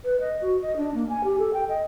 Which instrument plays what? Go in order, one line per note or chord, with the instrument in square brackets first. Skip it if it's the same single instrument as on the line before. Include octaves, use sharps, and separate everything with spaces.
[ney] B4
D#5
F#4
D#5
D4
A#3
G#5
G4
A4
G5
D#5